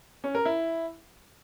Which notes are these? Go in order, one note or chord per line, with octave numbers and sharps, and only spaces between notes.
C#4
A#4
E4